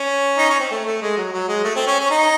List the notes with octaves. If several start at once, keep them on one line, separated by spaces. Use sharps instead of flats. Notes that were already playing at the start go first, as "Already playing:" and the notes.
Already playing: C#4
D#4
C#4
C4
A3
A3
G#3
F#3
F#3
G#3
A3
C4
C#4
C#4
D#4